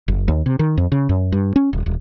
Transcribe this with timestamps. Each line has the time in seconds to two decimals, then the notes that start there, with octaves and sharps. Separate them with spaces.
0.08 F#1
0.28 D#2
0.46 C3
0.59 D#3
0.77 F2
0.92 C#3
1.09 F#2
1.32 G2
1.56 C#4
1.73 D#1
1.86 D#1